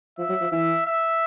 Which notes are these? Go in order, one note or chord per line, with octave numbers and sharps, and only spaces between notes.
F3 E5
F#3
F3
E3 E5
E5